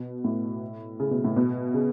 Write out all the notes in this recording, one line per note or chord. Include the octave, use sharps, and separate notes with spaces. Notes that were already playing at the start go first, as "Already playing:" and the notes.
Already playing: B2
A2
C#3
B2
A2
B2
C#3